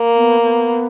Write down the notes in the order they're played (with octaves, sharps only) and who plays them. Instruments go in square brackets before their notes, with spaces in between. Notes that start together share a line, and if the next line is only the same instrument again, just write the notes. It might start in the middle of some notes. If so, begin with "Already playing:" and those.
Already playing: [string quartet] A#3
[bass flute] B3
B3